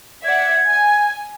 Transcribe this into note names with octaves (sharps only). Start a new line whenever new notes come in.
D5 E5 F#5 G#6
G#5